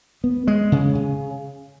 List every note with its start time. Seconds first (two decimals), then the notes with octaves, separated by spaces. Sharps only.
0.24 B3
0.47 G#3
0.72 C#3
0.95 C#3